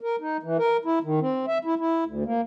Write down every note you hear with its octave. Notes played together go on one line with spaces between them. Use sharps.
A#4
D#4
E3
A#4
E4
D#3
C4
E5
E4
E4
D2
A#3